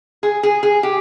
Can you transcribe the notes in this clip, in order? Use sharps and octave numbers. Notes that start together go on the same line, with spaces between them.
G#4
G#4
G#4
G4